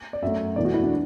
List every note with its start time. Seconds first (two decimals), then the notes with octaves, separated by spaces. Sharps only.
0.13 D5
0.23 F#2 F#3 A3 E5
0.56 E1 E2 E3 A3 D5
0.65 F#4
0.74 E4
0.83 D4